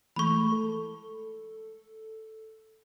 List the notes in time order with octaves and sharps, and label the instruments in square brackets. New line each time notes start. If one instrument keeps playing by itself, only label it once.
[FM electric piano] E3 G#3 A3 [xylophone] B5 C#6
[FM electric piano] A4